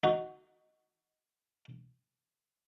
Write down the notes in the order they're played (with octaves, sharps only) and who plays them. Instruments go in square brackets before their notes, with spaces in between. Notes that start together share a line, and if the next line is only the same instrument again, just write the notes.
[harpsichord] D#4 F#4